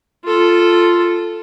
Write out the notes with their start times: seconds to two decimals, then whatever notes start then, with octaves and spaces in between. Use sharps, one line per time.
0.24 F4 A4